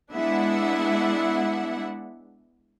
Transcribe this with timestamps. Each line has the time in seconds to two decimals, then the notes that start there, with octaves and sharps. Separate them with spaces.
0.13 G#3 B3 D4 E4 E5 F#5